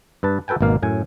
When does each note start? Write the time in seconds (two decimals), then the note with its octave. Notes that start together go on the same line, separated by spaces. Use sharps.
0.23 G2 B4 A5
0.48 F#4 A4 B4 G5 G#5
0.61 G#1 B2 A#3 F5
0.82 F#2 A2 G#5